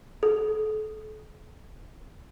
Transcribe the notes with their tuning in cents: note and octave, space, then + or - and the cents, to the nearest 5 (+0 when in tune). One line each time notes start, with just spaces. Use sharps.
A4 -35